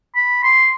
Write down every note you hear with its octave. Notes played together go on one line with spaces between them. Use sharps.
B5
C6